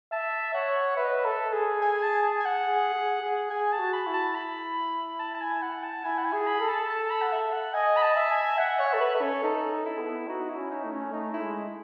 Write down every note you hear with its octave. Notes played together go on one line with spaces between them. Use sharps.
E5 A5
C#5 F#5
B4 E5
D#5
E5
A4
G#4
G#5
A5
G#5
F#5
G#4
G#4
G#4
G#4 G#5
A5
F#4
B5
E4
A5
B5
A5
A5
G#5
F#5
A5
E4 G#5
F#5
G#5
G#4
B5
A4
A5
A5
B5
F#5
E5
F#5
D#5 G#5
B5
A5
E5
G#5
E5 F#5
C#5
E5
A4
B4
A4
C#4
D#4 A4
A4
E4
B3
D#4 F#4
E4
C#4
D#4
A3
C#4
A3 D#4
E4
G#3